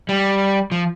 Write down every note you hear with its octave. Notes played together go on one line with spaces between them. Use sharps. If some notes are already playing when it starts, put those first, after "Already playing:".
G3
F3